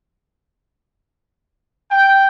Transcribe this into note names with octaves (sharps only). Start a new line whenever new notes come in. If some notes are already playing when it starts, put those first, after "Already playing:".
G5